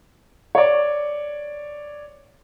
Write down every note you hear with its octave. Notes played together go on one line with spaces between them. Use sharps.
C#5 D5